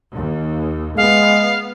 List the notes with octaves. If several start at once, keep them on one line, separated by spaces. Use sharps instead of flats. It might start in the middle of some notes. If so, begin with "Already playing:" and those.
D#2
G#3 B3 F5